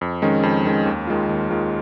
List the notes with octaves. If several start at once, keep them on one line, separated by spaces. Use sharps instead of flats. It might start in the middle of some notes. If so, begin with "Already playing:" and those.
F2
D#3 G#3 C#4
F2
D#3 G#3 C#4
D#2
D#3 G#3 F4
D#2
D#3 G#3 F4